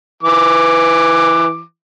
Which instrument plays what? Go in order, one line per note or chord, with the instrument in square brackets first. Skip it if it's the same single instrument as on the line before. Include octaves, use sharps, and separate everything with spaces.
[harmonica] E3 D6